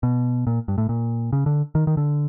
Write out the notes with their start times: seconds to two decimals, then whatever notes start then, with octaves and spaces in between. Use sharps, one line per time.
0.03 B2
0.47 A#2
0.68 G2
0.78 A2
0.89 A#2
1.33 C#3
1.46 D3
1.75 D#3
1.87 D#3
1.97 D3